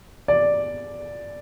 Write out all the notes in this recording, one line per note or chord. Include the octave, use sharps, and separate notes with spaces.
D5